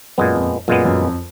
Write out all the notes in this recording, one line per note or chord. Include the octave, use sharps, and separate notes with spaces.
F#2 A#2 G#3 B3
F2
F#2 A#2 G#3 B3
F#2
F2